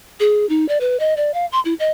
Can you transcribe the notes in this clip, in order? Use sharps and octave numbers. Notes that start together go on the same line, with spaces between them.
G#4
D#4
D5
B4
D#5
D5
F5
C6
E4
D#5